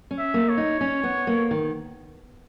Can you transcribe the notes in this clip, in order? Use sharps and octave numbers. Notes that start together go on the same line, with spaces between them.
C#4
E5
A#3
C#5
D#4
C#4
B3
A#3
D#3